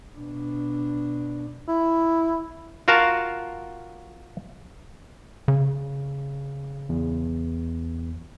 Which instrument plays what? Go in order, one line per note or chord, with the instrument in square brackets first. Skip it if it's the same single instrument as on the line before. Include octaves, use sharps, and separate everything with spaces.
[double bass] B2 D4
[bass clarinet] E4
[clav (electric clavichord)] F4 F#4 A#4 F5 F#5 A5
[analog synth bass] C#3
[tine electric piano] E2